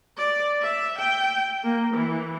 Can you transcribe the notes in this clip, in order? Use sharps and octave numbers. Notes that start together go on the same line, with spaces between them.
D5
E5
G5
A#3
E3